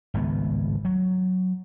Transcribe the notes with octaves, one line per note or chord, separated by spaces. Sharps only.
G#1 C#2 A2 B3
F#3